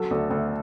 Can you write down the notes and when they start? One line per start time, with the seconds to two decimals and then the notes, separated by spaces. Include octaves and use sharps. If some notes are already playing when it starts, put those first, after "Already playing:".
Already playing: F#3 A4
0.11 D2
0.30 D2